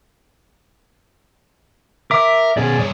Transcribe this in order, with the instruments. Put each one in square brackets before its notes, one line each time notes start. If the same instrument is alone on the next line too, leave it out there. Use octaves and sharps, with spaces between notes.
[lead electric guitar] A#4 [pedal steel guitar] E5 D6
[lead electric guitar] B2 C#4 [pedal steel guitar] G#4 D5
[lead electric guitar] G2 C#5